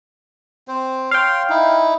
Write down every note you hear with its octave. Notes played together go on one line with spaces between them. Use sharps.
C4 C5
C#5 F5 G5 C6
D#4 E4